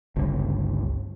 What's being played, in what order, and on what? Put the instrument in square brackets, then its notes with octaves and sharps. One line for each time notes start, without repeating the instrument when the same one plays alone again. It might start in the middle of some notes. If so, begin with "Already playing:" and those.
[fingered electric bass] G1 C#2